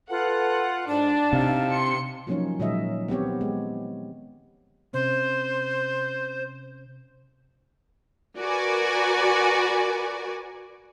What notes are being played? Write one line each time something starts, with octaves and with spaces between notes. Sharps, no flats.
F4 A4 B4 F#5
G#2 D4 A5
C3 D#4 E4 F5
C6 C#7
F3 F#3 A#3 C#4 D#4 C#5
A#2 D#3 F#3 G#3 D#5 E5
B3 C4 G4 C#5
G#3
C3 C#4 C5
F#4 A#4 B4 D5 G#5